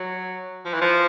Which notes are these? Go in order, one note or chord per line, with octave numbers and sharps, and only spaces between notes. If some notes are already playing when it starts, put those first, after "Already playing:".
Already playing: F#3
F3
E3
F3